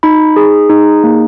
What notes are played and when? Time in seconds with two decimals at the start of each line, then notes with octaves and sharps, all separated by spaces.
0.03 D#4 B5
0.36 G#4
0.69 D#4
1.04 A#3